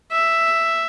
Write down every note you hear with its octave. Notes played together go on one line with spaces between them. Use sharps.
E5